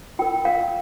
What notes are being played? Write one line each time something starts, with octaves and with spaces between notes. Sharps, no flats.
F4 A#4 G5
F5